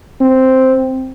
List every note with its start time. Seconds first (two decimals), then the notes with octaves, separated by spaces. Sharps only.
0.21 C4